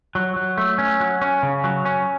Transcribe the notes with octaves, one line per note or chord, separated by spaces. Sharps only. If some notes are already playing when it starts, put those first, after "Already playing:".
F#3
F#3
A3
C#4
F#3
C#4
C#3
F#3
C#4